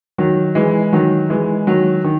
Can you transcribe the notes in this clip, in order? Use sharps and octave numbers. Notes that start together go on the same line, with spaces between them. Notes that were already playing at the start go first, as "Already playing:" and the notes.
D#3 F#3
E3 G#3
D#3 F#3
E3 G#3
D#3 F#3
D#3